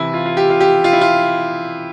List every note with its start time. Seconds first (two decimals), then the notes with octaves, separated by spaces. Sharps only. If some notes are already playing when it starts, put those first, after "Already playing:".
Already playing: C3 E3 E4
0.14 F4
0.25 F4
0.37 G4
0.50 F4
0.60 G4
0.84 F4
0.93 E4
1.01 F4